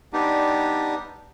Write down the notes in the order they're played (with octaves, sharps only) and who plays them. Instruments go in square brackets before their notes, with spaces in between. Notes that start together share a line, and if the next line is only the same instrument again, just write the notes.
[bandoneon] G3 B3 D4 D#4 G4